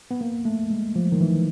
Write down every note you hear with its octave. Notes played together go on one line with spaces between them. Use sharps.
B3
A#3
A3
G#3
F3
D#3
E3